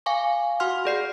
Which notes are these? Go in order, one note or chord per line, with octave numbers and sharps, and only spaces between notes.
F5 G#5 C#6 D6
F#4 F#5 C6 F6
G#4 D5 C7